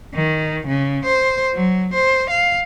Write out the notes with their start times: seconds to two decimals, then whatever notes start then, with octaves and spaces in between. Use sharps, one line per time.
0.14 D#3
0.67 C#3
1.05 C5
1.54 F#3
1.93 C5
2.30 F5